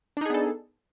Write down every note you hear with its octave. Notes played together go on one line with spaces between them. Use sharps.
B3 D4 D#4 G#4 A4